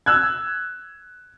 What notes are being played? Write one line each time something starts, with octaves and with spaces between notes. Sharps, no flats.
E6 F#6 G#6